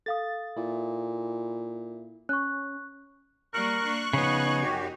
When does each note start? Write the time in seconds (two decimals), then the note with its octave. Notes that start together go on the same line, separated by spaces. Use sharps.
0.06 A4 F5 D#6 A6
0.57 A#2 E4
2.29 C#4 C#6 F#6
3.54 G3 A#3 A#4 C#6 F#6
3.84 A#3 D4
4.13 C#3 F3 B3 D#4 C#5
4.63 F#2 F#4 G4